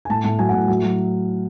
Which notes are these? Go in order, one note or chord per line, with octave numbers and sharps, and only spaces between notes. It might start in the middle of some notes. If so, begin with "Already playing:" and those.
G#5
A2 A5
A2 A5
F#3 G#5
F#5
A2
F#3
F#3